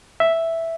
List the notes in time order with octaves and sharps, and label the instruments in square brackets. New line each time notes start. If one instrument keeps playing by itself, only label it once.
[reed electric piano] E5